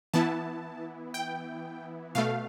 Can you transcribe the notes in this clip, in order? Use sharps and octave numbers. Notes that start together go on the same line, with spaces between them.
E3 B3 E4 A5
G5
B2 A3 F5